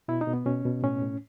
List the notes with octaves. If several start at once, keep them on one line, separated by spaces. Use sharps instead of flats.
B2 E4
D#4
B2
B3
B2 C#4
B2
A2 C#4
A2